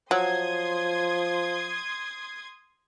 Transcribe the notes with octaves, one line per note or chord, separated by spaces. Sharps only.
F3 F#3 C6 D#6 G#6